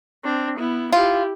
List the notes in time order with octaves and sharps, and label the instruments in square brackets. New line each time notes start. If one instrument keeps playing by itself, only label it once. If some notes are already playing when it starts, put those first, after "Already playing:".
[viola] C4 D4
B3 E4
[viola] E4 G4 [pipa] F4